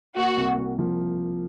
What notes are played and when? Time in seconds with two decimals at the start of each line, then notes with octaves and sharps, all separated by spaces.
0.16 A#3 F#4
0.37 C2
0.58 C2
0.79 F3